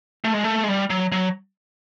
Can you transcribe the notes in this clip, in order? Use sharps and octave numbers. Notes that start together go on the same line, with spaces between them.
A3
G#3
A3
G#3
G3
F#3
F#3